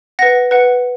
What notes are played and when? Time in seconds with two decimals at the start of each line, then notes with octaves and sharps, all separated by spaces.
0.19 B4 F#5 A#6
0.51 B4 F#5